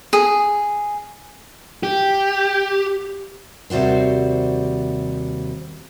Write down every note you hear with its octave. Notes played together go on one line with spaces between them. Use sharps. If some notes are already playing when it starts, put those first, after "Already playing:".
G#4
G4
D#2 C3 G3 F#4 C5